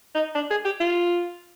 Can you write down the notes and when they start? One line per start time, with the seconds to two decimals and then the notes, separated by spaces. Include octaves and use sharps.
0.15 D#4
0.35 D4
0.51 G#4
0.65 G4
0.80 F4